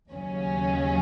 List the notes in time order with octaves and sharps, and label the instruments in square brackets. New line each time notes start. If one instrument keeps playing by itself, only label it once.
[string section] D#2 C#3 F#3 C#4